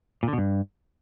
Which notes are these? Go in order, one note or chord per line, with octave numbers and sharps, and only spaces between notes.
A#2
D3
B2
G2